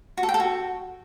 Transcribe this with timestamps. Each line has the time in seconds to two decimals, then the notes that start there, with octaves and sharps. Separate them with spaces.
0.17 F#4
0.23 A4
0.29 G5
0.34 A4
0.40 F#4